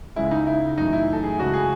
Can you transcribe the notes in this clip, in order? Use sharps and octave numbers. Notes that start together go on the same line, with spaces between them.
C#2 C#3 G#3 E4
D#4
E4
F#2 E3 A3 D#4
E4
A4
G#4
C#2 C#3 G#3 F#4
G#4